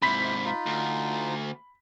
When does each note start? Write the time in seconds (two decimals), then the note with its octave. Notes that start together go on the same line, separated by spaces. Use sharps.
0.02 G#2 C3 E4 C5 B5 B6
0.45 D#4 F4
0.66 D2